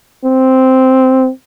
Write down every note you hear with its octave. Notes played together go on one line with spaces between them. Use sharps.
C4